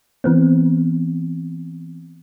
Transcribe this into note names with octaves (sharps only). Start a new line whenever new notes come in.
E3 B3 C4